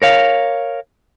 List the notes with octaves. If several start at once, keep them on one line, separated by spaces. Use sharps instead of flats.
A#4 C#5 F5